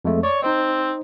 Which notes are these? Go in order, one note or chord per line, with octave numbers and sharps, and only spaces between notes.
F2 G#3 A3
C#5 D5
C4 D#4 C5 D#5